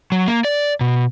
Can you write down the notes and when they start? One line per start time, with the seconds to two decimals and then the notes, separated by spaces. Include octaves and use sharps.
0.12 F#3
0.27 A#3
0.45 D5
0.81 B2